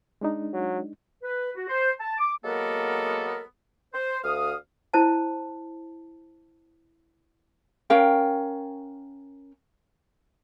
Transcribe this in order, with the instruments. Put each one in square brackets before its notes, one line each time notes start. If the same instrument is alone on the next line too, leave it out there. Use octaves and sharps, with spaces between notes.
[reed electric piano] G#3 D4 D#4
[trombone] F#3
[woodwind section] B4
F#4
C5
A5
D6
F#3 G#3 A#3 B3 A4 A#4
C5
D2 F5 D#6
[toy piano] E4 C5 A5
[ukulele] C#4 A#4 F5 G5